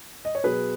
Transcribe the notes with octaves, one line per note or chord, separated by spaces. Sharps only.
D#5
C#5
B2 F#3 G#4 B4